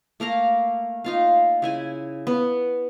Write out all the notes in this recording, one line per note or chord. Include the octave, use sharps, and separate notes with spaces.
A3 A#3 F5 A#5
D#4 F4 F5
C#3 E4 G#5
B3